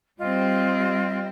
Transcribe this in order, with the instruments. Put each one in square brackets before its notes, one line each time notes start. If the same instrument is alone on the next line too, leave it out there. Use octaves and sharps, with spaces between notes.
[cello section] G3 C4 [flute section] F4 D#5